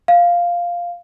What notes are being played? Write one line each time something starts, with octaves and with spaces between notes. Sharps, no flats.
F5